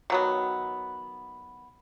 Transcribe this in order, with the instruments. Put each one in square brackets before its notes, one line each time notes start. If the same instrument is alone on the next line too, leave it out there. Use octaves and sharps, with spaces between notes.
[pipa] D#3 F#3 B3